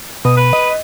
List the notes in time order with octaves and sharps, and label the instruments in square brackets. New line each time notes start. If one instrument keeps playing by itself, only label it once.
[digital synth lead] B2 [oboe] D#6
[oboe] B4
[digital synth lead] D#5